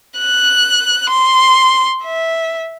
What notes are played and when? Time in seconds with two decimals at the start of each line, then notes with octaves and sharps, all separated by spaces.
0.19 F#6
1.09 C6
2.04 E5